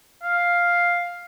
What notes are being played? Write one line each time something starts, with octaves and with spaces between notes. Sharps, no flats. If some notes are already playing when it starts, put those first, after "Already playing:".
F5